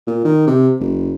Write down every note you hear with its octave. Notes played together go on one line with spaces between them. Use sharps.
A#2
D#3
C3
F#1